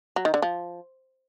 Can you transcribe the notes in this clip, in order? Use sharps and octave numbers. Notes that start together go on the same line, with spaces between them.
F#3
D#3
D3
F3